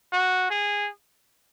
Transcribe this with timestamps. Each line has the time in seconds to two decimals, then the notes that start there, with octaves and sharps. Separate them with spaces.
0.13 F#4
0.50 G#4